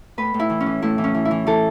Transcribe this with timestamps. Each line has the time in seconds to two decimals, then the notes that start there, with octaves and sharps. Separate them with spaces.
0.18 A2 B4
0.34 A2
0.39 E4
0.50 E3
0.61 C#4
0.66 E3
0.82 A2 E4
0.98 E3
1.04 C#4
1.14 E3
1.25 E4
1.31 E3
1.47 E3 A4